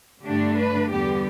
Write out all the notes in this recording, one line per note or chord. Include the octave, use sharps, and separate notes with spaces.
G2 D3 A3 D4 G4
B4
E2 D3 G3 B3 G4